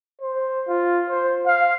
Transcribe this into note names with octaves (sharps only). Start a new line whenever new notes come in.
C5
F4
C5
F5